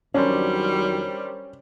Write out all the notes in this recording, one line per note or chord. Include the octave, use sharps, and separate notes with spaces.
F2 D#3 F#3 G3 C#4 D4 A#4 C5